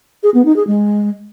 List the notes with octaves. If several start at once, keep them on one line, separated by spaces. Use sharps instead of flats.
G#4
B3
D#4
G#4
G#3